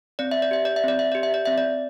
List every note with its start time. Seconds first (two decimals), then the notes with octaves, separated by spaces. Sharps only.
0.19 C4 D5
0.31 E5
0.42 D5
0.51 G4 E5
0.65 D5
0.76 E5
0.84 C4 D5
0.99 E5
1.12 G4 D5
1.23 E5
1.34 D5
1.45 C4 E5
1.58 D5